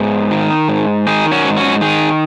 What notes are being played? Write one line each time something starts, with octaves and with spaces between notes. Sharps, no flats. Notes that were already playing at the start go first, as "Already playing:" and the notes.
Already playing: G#2 B3
D#3
G#2
D#3 D#4 G#4
C#4 F#4
G#2
C#4 F#4
D#3 D#4 G#4